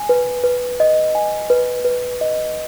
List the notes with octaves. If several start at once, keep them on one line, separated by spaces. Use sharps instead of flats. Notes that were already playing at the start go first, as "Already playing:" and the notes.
Already playing: G#5
B4
B4
D#5
G#5
B4
B4
D#5